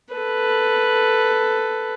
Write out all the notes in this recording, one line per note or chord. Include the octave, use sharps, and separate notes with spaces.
A4 B4